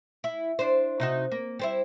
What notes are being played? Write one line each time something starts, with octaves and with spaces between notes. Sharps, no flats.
E4
D4 C5
C3 D#4 F#4
A#3
G3 C4 E4